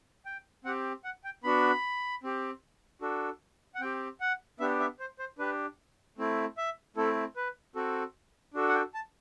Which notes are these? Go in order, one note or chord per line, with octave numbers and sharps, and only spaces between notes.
G5
C4 G4 F#5
F#5
G5
B3 D4 F#4 B5
C4 G4
D4 F#4 A4
F#5
C4 G4 G5
F#5
B3 D4 G4 E5
E5
C5
C5
D4 G4 B4
A3 C4 E4
E5
A3 C4 E4 A4
B4
C4 F#4 A4
D4 F#4 A4
F#5
G5
A5